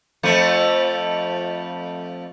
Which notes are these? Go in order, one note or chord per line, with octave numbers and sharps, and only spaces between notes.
F2 F3 A3